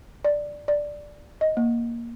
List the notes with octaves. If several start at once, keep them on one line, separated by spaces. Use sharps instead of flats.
D5
D5
D#5
A#3